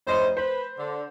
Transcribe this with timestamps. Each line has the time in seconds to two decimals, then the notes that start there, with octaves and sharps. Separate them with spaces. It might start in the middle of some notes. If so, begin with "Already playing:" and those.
0.07 F1 C#4 E4 C5 D#5
0.37 B4 C5
0.79 D3